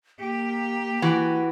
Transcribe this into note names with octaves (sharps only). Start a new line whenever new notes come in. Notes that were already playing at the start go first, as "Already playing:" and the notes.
A#3 G4
E3 F#4